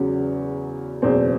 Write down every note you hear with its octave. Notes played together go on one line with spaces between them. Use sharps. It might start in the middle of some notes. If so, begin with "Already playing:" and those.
Already playing: E2 C#3 F#3 C#4
F#1 E2 B2 C4